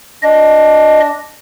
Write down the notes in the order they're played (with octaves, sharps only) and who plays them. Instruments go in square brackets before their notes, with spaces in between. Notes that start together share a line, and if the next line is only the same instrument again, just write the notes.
[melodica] D4 [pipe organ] D#5